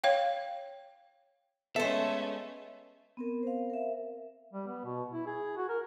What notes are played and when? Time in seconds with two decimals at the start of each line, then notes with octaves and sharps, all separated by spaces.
0.04 C#5 F5 G5
1.76 G#3 A3 B3 C#4 A4 C5 E5
3.17 B3 C4 A#4
3.43 C5 F5
3.70 A#4 E5
4.53 G3
4.67 B3
4.85 B2
5.12 E4
5.26 G#4
5.57 F#4
5.69 A#4